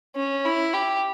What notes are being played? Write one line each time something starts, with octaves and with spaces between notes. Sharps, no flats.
C#4
E4
G4